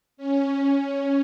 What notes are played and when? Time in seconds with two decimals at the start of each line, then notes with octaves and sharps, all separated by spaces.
0.17 C#4
0.59 C#4